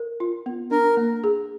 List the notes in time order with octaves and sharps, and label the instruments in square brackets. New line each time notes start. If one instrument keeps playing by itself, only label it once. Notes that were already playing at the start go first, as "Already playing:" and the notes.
Already playing: [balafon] A#4
F4
B3
[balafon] D4 [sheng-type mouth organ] A#4
[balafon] A#3
G#4